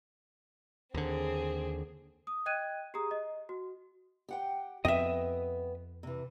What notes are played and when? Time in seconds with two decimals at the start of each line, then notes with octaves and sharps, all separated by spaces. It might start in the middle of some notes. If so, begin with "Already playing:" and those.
0.94 D#2 D3 C4 G#4
2.27 D#6
2.46 D#5 G5 F#6 G#6 D#7
2.94 G4 G#4 A#5 D#6
3.11 D#5
3.49 F#4
4.29 G4 F#5 G5
4.85 F2 B3 C4 D#5 E5 G5
6.03 C3 E3